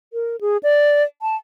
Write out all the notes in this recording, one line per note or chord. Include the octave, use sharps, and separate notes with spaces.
A#4
G#4
D5
A5